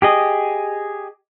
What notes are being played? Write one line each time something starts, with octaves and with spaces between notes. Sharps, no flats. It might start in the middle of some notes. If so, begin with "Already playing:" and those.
G4 G#4 D#5